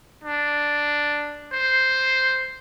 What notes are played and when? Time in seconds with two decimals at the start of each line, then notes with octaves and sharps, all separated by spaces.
0.24 D4
1.52 C5